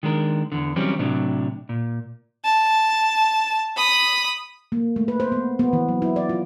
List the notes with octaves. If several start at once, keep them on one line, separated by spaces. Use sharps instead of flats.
D#3 G#3 D4 A#4
E2 D3
E3 F#3 G3 C4 C#4
A2 C3 F#3 D4
A#2
A5
B5 D#6
A#3
A3
B4
C5
B3
B3
E3
F#3
E4
D5
F4